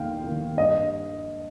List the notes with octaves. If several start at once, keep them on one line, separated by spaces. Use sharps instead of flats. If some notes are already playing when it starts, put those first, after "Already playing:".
Already playing: D#2 D#3 A#3 D#4 F5 G5
D#3 A#3 D#4
G2 D#5